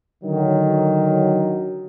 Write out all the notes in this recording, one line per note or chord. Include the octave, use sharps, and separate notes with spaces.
D3 D#3 F#3